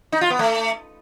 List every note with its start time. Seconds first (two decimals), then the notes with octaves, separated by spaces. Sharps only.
0.12 D#4
0.21 F4
0.30 B3
0.39 A3